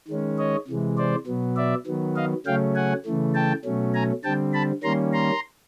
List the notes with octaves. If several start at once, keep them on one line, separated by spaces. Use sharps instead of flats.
D#3 G#3 C#4
C#5 D#5
C3 E3 G#3
C5 D5
B2 F#3 B3
D5 E5
D#3 F#3 B3
D#5 F5
C#3 F#3 A3 C#4 F5 G5
F#5 G#5
C#3 E3 A3
G5 A5
B2 F#3 A3 C#4
G#5 A#5
D3 G3 C4 G5 A5
A5 B5
D#3 G3 A#3 C#4 A#5 C6
A#5 C6